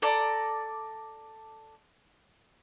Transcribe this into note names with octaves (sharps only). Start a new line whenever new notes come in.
A4 D5 A#5